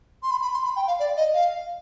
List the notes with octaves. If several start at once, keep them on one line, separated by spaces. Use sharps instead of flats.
C6
B5
B5
C6
B5
G5
F5
D5
D#5
F5